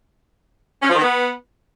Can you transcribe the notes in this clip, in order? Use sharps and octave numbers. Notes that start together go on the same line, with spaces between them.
C#4
F3
D#3
B3